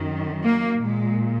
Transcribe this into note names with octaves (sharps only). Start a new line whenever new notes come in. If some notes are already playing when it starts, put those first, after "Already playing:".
Already playing: F#2 D#3
A#3
A#2 G#3